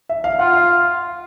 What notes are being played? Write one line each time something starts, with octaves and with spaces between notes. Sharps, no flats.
E5
F5
F4 F#5
F5